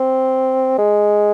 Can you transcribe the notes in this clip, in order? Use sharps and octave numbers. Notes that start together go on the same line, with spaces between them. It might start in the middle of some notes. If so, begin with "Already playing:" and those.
Already playing: C4
G#3